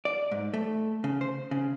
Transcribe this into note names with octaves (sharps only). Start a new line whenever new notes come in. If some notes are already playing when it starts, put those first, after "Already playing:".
D5
G#2
A3
C#3
C5
C#3